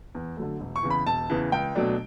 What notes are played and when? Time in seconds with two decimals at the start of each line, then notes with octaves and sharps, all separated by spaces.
0.15 E2
0.37 D3 F#3 A3
0.60 E1
0.76 C#6
0.83 E2 C#3 E3
0.90 B5
1.06 E1 A5
1.30 E2 C#3 E3
1.52 C#2 G5
1.75 B2 F#3 A3 D4